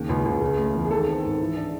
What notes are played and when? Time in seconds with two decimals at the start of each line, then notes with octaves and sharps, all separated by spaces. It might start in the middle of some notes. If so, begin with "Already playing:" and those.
Already playing: D#2 C#3
0.09 C#2
0.25 C#2
0.41 C#3
0.57 A3
0.74 E2
0.85 G#4
0.91 D#3 A4
1.07 C4
1.24 G#2
1.40 E3
1.56 D4